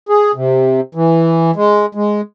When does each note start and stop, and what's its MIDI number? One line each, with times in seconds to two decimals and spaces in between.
0.09 0.31 68
0.35 0.81 48
0.95 1.51 52
1.56 1.86 56
1.95 2.21 56